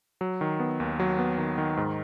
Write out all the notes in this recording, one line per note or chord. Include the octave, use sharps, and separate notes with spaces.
F#3
D#3
B3
D#2
F#3
B3
D#3
D#3
G#2